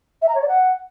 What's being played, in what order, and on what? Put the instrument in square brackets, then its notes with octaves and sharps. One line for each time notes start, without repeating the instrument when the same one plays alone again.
[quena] E5
A#5
C#5
D5
F#5